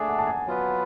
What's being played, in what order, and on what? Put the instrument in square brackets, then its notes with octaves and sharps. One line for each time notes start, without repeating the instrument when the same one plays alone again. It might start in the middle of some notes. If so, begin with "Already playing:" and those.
Already playing: [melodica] A3 D4 G#4 [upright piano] G#5
[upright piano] F#5
A5
G#5
[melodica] F#3 B3 F4 B4